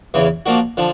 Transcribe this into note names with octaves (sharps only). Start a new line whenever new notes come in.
E2 C#3 E3
F3 A#3 D4 F#4
D3 F3